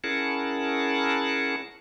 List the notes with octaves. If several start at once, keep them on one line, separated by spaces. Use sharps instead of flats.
C#4 E4 G#4 A#4 F#5 A5